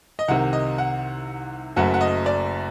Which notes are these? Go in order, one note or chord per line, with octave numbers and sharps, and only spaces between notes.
D#5
C2 C3 D#3 F#5
D#5
F#5
F#1 F#2 F#3 A3 F#5
F#5
D#5
D5